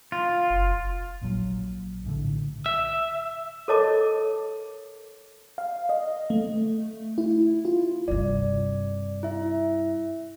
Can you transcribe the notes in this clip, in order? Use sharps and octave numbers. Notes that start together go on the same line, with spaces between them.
F4
F#1
A#1 A#2 C#3 F#3
A#1 A2 D3
E5
A4 A#4 C#5 D#5 A5 D6
F5
D#5
A3
E4
F4
G2 C3 D5
E4 E5